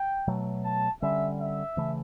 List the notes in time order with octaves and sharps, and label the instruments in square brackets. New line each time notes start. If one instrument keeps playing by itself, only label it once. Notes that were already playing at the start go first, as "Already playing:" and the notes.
Already playing: [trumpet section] G5
[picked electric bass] B2 F#3 A3
[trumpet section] A5
[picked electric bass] D3 G3 C#4 [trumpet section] E5
[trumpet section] E5
[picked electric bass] C#3 E3 A3